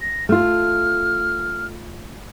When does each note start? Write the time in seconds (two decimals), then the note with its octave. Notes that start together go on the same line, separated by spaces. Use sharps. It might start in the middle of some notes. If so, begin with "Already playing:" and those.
0.01 A#6
0.29 A3 F4 F6